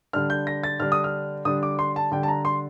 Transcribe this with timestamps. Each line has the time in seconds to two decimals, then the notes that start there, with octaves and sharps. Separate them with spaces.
0.13 D3 G3 D4 F6
0.30 G6
0.47 A#6
0.64 A6
0.80 D3 G3 D4 F6
0.92 D#6
1.04 F6
1.45 D3 G3 D4 D#6
1.63 D6
1.79 C6
1.96 A5
2.12 D3 G3 D4 G5
2.23 A5
2.28 A#5
2.45 C6